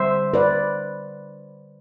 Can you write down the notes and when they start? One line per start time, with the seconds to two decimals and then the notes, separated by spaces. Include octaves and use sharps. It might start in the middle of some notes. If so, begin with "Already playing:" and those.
Already playing: D3 G3 C5 E5
0.34 B4 D5